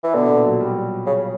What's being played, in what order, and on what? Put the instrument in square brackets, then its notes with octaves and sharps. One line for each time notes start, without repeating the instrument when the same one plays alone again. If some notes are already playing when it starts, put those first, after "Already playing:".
[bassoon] E3
[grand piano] B2 [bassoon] D3
[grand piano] A#2
F#3
G3
[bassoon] C#3